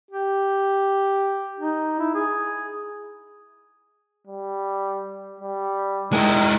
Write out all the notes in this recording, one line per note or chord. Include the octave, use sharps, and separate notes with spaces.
G4
D#4
E4
G#4
G3
G3
D#3 G#3 E4